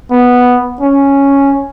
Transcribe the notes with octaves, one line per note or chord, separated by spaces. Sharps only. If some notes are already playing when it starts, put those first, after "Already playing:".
B3
C#4